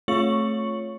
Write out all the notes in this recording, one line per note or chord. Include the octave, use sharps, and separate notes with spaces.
A3 F4 C#5 C#6 C#7 F#7